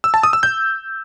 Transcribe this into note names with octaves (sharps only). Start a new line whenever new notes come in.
E6
A5
D#6
E6
G6